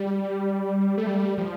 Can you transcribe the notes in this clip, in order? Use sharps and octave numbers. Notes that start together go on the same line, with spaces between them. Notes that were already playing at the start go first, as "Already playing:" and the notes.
Already playing: G3
A3
G3
F3